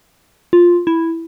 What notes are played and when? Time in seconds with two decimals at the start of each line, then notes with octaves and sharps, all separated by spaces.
0.53 F4
0.87 E4